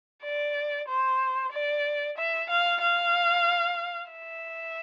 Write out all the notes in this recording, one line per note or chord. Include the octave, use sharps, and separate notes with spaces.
D5
C5
D5
E5
F5
F5
E5